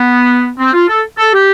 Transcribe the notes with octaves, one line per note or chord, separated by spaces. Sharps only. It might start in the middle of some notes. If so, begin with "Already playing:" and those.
Already playing: B3
C4
F4
A4
A4
G4